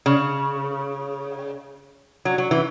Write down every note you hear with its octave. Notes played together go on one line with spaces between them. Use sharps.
C#3
F#3
F#3
E3